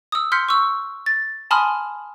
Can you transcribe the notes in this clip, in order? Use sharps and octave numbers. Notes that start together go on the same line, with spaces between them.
D#6 E6
C6 F6 G6 B6 C#7
C#6 E6
A6
G#5 A5 B5 C6 D#6 F6